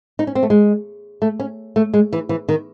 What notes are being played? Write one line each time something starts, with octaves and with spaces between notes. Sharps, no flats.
D#4
C#4
C4
A3
G#3
A3
C#4
A3
G#3
E3
E3
D#3